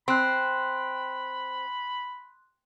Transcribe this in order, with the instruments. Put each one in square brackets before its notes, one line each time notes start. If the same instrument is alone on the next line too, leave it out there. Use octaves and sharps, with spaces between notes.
[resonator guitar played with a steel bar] C4 [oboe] B5 [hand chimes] C6 F#6